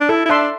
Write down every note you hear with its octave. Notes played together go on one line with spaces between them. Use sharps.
D4
E4 A4
E4
D4 E5 A5 C6